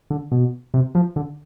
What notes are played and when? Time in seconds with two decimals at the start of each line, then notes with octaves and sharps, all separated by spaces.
0.10 D3
0.32 B2
0.74 C3
0.95 F3
1.16 D3